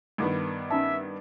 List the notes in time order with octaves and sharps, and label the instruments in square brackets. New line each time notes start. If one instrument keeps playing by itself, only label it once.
[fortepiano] G2 D#3 B3
[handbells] C#4 D#4 A5 [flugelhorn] E5